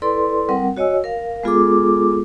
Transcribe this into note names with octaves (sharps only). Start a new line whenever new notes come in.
E4 A4 B4 D5 C6
G3 C4 A#4 F#5
F#4 C#5 D#5 G#5 E6
A#4 F5
G#3 B3 F4 G#4 A4 D6